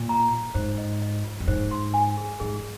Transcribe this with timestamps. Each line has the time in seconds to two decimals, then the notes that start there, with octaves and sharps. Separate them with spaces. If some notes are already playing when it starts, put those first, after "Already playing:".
Already playing: A#2
0.09 A#5
0.32 A#5
0.54 G#2 C5
0.78 D#5
1.02 D#5
1.24 F4
1.40 F2
1.48 G#2 C5
1.71 C6
1.94 G#5
2.17 G#4
2.40 G#2 G#4